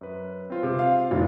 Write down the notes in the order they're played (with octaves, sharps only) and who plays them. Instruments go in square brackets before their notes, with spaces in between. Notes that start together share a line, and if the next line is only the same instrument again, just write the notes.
[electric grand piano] F#2 B4
C4 F4 C5
[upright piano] C3
F5
F1 A2